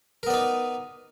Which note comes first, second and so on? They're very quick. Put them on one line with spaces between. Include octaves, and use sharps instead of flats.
A#4 B3 D5 D#4